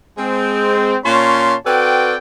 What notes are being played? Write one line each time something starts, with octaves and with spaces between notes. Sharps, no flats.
G#3 C4
A#2 C#4 C#5 A5 C6
C4 F#4 A4 B4 D5 G5